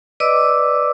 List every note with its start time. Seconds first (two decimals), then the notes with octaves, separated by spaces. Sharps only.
0.20 B4 D5 D#5 D6 E6